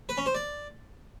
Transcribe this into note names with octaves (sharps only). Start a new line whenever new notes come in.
B4
C#4
C5
D5